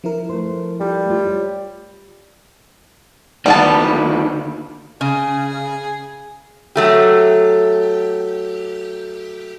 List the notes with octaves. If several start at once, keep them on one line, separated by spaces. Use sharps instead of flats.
F3 E4 A#4
A3 B4 C5
G3 F4 G4 A4
A3 F4
C#5
D2 D#3 G3 B3 A5
C#3 G#4
F#3 A3 G4